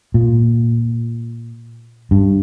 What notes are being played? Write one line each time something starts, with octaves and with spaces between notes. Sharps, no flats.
A#2
G2